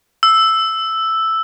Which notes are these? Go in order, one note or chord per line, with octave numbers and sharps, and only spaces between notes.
E6